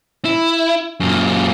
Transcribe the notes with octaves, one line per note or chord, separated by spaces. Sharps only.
E4
F#2 A#2